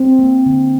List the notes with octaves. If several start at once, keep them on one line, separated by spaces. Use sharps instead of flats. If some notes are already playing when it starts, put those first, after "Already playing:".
Already playing: C4
A#3
D3